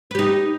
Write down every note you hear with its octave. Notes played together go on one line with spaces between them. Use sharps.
D#4 G4 B4